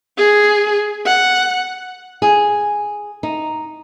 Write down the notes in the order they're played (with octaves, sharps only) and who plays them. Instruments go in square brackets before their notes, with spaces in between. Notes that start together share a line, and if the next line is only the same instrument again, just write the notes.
[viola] G#4
F#5
[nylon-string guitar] G#4
D#4